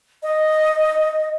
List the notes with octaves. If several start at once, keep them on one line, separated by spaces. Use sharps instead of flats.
D#5